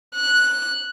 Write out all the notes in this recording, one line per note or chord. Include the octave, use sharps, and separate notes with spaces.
F#6